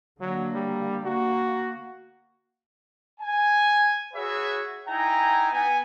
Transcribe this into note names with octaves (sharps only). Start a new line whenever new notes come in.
D3 F#3 A#3
G3
A#3 F#4
G#5
F#4 G#4 B4 C#5 E5
D#4 E4 G5 G#5 A#5
B3 G#5